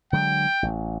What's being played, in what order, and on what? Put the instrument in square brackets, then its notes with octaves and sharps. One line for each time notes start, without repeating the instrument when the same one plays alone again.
[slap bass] D3 F#3 G#3 [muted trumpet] G5
[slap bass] A1